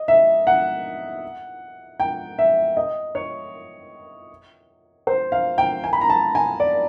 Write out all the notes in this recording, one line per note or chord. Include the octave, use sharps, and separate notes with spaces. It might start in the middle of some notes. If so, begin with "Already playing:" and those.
Already playing: D#5
E5
F#5
G5
E5
D#5
C#5
C5
F5
G5
G#5
B5
A#5
A5
G#5
D5